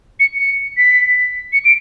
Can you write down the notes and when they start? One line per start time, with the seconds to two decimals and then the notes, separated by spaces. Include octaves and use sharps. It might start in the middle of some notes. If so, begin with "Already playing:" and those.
0.20 C#7
0.39 C#7
0.77 B6
1.53 C#7
1.65 D7